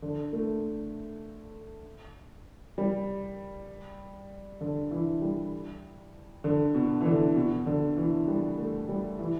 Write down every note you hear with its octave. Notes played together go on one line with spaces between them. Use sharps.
D3
A3
G3
D3
E3
G3
D3
B2
E3
D3
B2
D3
E3
G3
A3
G3
E3